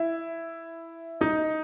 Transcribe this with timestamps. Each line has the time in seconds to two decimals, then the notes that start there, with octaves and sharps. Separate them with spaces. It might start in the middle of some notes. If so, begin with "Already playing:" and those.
Already playing: E4 E5
1.21 D#4 D#5